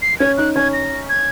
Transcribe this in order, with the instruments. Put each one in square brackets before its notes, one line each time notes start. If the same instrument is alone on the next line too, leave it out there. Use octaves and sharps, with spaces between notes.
[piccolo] C7
[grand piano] C#4 [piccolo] G#6
[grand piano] D#4 [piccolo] F#6
[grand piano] C#4 [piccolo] G#6
[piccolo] A#6
G#6